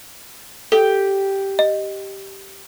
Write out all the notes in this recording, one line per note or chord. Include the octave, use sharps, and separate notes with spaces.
G4 A4
D#5